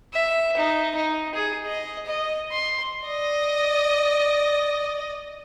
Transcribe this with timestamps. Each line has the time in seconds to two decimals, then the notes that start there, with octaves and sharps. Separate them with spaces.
0.14 E5
0.57 D#4
0.95 D#4
1.34 G#4
1.66 D#5
2.06 D#5
2.52 C6
3.07 D5 D#5